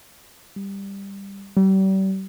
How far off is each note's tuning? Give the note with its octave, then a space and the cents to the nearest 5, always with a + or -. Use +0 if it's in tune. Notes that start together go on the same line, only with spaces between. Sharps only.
G3 +10
G3 -35